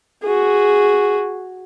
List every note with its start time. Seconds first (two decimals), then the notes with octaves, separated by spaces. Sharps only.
0.23 F#4 G#4